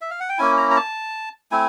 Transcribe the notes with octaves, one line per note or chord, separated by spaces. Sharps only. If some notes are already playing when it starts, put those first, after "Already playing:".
E5
F5
F#5
G5
A#3 C#4 E4 G#5
A#5
A#5
A5
A3 C4 E4 G#5